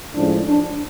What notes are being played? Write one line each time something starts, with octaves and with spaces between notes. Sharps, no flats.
A2 F3 G#3 C#4 D4
D4